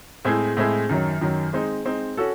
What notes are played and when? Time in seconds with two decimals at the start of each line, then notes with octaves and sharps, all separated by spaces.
0.25 A2 G#3 C4 E4 G#4
0.57 A2 G#3 C4 E4 G#4
0.89 F#2 D#3 F#3
1.21 F#2 D#3 F#3
1.53 G#3 C4 D#4
1.85 G#3 C4 D#4
2.17 C#4 F#4 A4